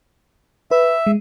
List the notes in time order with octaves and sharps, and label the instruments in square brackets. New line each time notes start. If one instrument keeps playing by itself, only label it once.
[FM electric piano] B4 [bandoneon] E5
[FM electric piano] G#3